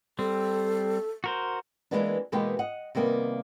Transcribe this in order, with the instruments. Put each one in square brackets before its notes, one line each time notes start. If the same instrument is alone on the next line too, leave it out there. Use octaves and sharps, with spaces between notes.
[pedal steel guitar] G3 C4 [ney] A4
[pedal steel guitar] F#4 A#4 C5
[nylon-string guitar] E3 F#3 G#3 A#3 B3 D4
B2 E3 G#3 A#3 B3 G4
D#5 F#5
C3 D#3 G3 A#3 B3